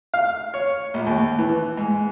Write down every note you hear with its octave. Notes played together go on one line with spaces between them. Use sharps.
F5
C#5
A#1
D#2
E3
G#2